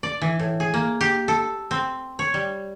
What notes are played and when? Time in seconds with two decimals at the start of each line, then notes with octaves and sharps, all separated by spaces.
0.03 D5
0.21 E3
0.39 A2
0.60 G#4
0.74 A#3
1.01 G4
1.28 A4
1.71 C4
2.19 C#5
2.34 G3